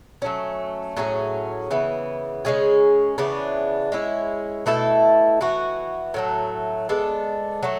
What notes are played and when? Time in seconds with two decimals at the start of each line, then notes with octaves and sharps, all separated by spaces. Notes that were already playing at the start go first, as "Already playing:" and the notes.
0.22 F#3 A3 C#4
0.97 A2 F#3 C#4 G#4
1.71 C#3 E3 B3
2.45 C#3 G#3 C#4 G#4
3.18 C#3 E3 B3 D4
3.92 G#3 C#4 E4
4.66 B2 A3 E4 A4
5.41 E3 B3 F#4
6.14 A2 F#3 A3
6.89 G#3 B3 D4 A4
7.63 F#3 A3